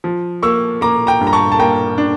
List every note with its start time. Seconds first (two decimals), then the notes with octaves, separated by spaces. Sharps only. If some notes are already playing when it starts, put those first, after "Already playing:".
0.04 F3
0.43 A#3 C#6 E6
0.81 A#3 A#5 D6
1.07 G5 A#5
1.21 G2
1.27 A#5
1.33 A5 C#6
1.52 A5
1.59 A#3 G5 A#5
1.98 D4